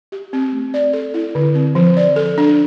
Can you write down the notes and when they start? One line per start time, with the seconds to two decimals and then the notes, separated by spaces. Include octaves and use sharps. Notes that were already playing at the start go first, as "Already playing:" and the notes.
0.12 G4
0.33 C4
0.52 A3
0.74 D5
0.93 A4
1.14 E4
1.35 D3
1.55 C4
1.75 F3
1.97 D5
2.16 A4
2.38 D4